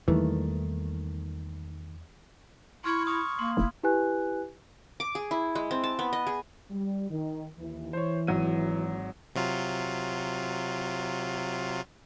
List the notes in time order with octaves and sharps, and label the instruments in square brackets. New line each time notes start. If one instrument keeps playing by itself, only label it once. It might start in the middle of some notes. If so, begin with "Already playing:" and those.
[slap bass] E2 G3 A#3 [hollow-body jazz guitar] D#3 A3 [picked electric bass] E3
[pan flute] E4 [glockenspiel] C6 F6 G#6 [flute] C#6
[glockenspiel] B5 D#6 F6 [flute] C#6
[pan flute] A#3 [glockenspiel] C6
[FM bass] F1 [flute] E4
[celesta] E4 G4 B4 G#5 F#6
[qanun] D6
G#4
E4
G#3
C4
A5
B3
D#5
G#4
[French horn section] G3
D#3
D#2 E3
[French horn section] E3 [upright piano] C5 C#5
[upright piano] G#1 F#3 D#7
[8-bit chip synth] C3 F#3 F4